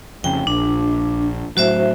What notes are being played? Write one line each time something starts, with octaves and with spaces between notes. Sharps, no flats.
F2 C#3 G5
A#1 D4
A2 F#3 F#4 C5 E5